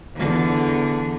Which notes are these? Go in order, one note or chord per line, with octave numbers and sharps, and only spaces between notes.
E2 D3